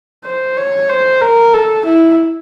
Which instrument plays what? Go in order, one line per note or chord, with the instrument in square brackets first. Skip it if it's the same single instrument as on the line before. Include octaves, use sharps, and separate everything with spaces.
[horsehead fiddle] C5
C#5
C5
A#4
A4
E4